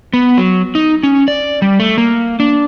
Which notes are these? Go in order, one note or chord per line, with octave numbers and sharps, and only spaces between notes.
B3
F#3
D#4
C#4
D5
G3
A3
A#3
D4